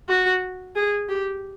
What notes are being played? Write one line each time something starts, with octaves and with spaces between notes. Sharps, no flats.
F#4
G#4
G4